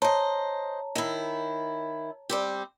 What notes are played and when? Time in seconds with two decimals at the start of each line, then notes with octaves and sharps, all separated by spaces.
0.02 C5 C#5 D#5 A5 A#5
0.95 D#3 E4
2.29 G3 C4 G4